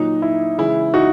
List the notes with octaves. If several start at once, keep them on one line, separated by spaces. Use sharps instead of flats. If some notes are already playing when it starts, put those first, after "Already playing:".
Already playing: A#2 F#3 D#4
E4
C#3 E3 G#3 E4
D#4 F#4